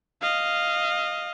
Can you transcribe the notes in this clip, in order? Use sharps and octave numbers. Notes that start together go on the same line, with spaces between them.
D#5 F5